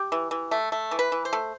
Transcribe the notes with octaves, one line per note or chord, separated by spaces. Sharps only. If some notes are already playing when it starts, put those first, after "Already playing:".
Already playing: G4
E3
E3
A3
A3
E3
B4
E3
C5
A3